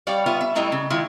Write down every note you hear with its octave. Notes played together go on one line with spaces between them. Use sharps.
G3 C#5 D5 F5
B3 F4 E5
E5
A2 G3 A3 E4 D#5 A#5
C#3
D#3 G#3 E4 F4